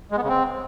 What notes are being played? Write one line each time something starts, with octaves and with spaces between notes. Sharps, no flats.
G#3
B3
C#3
C4